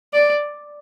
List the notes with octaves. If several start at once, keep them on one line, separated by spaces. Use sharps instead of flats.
D5